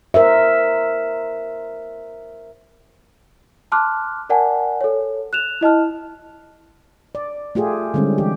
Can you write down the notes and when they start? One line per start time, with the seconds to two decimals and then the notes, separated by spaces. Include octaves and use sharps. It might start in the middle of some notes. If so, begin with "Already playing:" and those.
0.14 A#4 C5 E5
3.72 A5 C6 D6 F6 F#6
4.29 A#4 D5 F#5 G#5 A5
4.81 A4 C#5
5.33 F#6 E7 F7
5.61 E4 D#5 A5 F6
7.15 D5
7.55 A3 F4 G4 G#4
7.94 D3 G3 G#3 C4 C#4
8.18 E3 G4